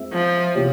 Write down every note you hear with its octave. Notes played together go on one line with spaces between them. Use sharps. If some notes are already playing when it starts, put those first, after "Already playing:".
Already playing: G#3 C4 F4 E5
F3
C3 F3 C4 G4 C#5